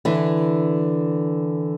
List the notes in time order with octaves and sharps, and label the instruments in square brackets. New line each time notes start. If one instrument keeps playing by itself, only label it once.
[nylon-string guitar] D3 E3